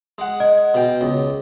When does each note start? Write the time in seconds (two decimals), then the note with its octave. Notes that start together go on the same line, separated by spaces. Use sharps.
0.18 G#3 F#5
0.40 D#5
0.74 B2 G5
1.01 C#2